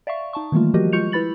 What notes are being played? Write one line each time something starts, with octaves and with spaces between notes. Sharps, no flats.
D5 E5 F5 C#6
D#4 A5 C#6
D#3 E3 G3 A3 A#3 F4
F3 G3 F#4 G4 A#4 D#5
G#3 F4 C#6 G6 C#7 F7
E4 B4 B5 A6 F#7